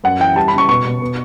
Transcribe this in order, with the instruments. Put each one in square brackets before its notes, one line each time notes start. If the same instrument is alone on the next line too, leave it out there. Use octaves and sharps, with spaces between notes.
[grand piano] F#2 F#5
E3 G5
G3 A5
B5
C#3 C#6
B2 C#6
B2
B3